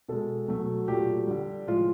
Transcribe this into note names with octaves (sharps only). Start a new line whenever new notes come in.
B2 G#3 A4
B2 F#3 A3
A#2 F#3 A3 G4
D3 G3
A2 F3 G#3 F4